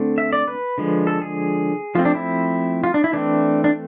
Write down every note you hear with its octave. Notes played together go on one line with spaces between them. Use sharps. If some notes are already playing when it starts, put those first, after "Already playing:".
Already playing: D3 A3 C4
E5
D5
B4
D3 F3 G#3
A4
G#4
F3 A3 C4 F4
D4
E4
F4
D4
E4
E3 A3 C4 D4
D4